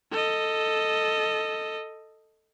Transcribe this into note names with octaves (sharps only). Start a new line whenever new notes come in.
A4 D#5